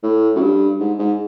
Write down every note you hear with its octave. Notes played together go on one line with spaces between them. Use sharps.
A2
F#2
G2
G#2
G#2